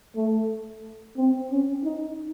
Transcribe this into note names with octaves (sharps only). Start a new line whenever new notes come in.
A3
C4
C#4
D#4